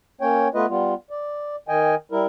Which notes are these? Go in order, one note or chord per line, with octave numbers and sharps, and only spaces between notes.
A#3 C#4 C#5 G5
A3 B3 F4 B4 D#5
G3 B3 F4
D5
D#3 D#5 G5 G#5
G3 E4 A#4